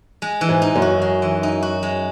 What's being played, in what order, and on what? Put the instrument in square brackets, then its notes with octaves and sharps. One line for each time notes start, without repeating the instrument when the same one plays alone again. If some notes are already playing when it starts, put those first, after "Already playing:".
[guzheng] G#3
E3
[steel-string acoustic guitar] G#2
[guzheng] D#4
[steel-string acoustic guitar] F#2
[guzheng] F#4
G#3
E3
D#4
F#4
G#3